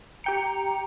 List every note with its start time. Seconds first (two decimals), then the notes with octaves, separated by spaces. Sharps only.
0.24 G4 G5 A#5 C#7